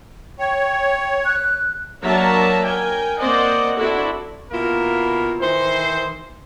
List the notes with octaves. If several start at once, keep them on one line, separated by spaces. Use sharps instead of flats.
C#5 G5
F#6
F#3 A#3 D4 E5 A5 A#5
A#4 G5 G#5
A#3 C4 C5 D5 D#5 F#5
C4 D4 E4 F#4 A4
B2 A#3 E4 F4 A#4
D#3 E3 C5